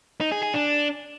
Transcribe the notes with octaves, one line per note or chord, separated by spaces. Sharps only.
D#4
G#4
G#4
D4